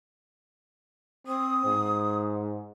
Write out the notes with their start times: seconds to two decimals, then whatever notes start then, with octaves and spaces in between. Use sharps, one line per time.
1.27 C4 D#6
1.65 G#2